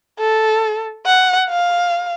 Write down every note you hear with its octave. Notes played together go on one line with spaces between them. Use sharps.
A4
F#5
F5